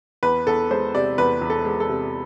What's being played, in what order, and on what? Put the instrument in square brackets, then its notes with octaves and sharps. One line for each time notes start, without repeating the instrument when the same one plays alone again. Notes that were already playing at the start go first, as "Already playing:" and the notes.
[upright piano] E2 B4
E2 A4
G#3 C5
C3 D5
E2 B4
E2
A4
G#3
A4
C3